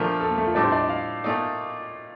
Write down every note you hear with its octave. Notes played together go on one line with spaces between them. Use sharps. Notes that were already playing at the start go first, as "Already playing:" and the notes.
Already playing: A#2 F3 A3 D4 A#4
A4
A#3
A3
F4
A2 G3 D4 D5
C5
D5
D#5
F5
A#2 A3 D#4